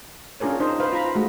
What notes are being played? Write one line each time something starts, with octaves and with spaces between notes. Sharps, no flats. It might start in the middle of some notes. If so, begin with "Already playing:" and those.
C#4 D4 F4 G#4 A#4 C#5
D#4 C5 D#5 A#5
B4 C5 F5
F4 A#5 B5
G#3 A3 F#4